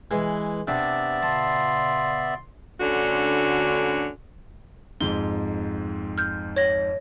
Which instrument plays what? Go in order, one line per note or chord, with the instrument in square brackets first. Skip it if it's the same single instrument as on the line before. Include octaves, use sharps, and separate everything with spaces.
[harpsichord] E3 G#3
[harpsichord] C3 D4 [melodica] B3 D5 E5
[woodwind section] A#2 C#3 C6 [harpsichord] A5
[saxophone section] D2 D3 C#4 F#4
[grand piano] F2 G#2 [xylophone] G7
[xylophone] F6 G6
C#5 A#6